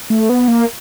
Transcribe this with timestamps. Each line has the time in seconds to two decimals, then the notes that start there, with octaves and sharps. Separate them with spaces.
0.10 A3
0.29 B3
0.48 A#3